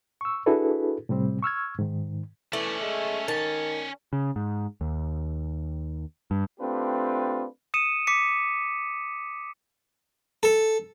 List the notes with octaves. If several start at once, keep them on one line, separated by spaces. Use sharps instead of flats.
C#6 E6
D4 E4 F#4 G#4 A4 B4
A2 C3 G3 C4
C#6 E6 F6 G#6
G#2 D#3
E3 A3 C#4 D5
G#3
D#3 A5
C#3
G#2
D#2
G2
A3 C4 D4 F4 G4 B4
D#6 C#7 D#7 E7
D6 B6 C#7
A4